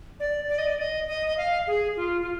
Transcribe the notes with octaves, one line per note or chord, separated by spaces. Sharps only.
D5
D5
D#5
D5
D#5
D#5
D#5
F5
G#4
F4
F4